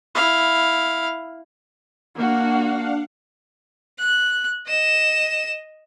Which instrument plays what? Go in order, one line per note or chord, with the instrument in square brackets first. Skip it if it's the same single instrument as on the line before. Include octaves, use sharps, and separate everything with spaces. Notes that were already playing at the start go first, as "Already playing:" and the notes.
[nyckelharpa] E4 F5
[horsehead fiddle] A#3 F#4 [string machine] D4 F5 F#5
[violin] F#6
D#5 E7